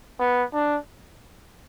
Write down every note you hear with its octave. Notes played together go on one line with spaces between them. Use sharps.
B3
D4